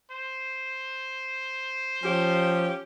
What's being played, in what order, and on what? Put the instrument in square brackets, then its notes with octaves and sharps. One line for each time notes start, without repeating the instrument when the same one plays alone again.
[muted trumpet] C5
[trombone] F3 [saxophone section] C#4 G4